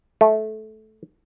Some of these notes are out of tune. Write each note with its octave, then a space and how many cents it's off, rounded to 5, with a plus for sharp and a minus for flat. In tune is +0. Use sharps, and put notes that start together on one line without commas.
A3 -15